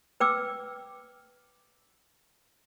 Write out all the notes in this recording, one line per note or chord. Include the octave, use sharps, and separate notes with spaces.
B4 G5 D6 E6